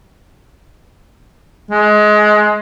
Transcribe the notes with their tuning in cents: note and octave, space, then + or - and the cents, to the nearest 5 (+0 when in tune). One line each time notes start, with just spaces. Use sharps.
G#3 +20